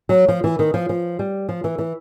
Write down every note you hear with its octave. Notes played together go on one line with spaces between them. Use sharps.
F#3
F3
E3
D#3
F3
F3
G3
F3
E3
E3